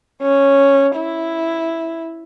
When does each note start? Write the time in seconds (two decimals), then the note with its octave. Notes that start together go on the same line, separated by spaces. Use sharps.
0.22 C#4
0.97 E4